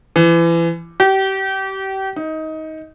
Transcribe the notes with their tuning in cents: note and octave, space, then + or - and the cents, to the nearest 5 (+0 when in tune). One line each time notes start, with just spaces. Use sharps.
E3 +30
G4 -30
D#4 +20